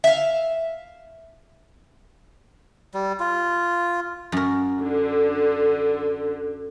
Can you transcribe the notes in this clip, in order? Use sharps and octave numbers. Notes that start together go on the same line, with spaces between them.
E5 F5
G3
F4
F#2 A#4
D3